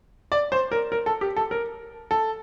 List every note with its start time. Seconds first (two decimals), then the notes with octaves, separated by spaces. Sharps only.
0.32 D5
0.52 C5
0.72 A#4
0.92 A#4
1.06 A4
1.21 G4
1.36 A4
1.51 A#4
2.11 A4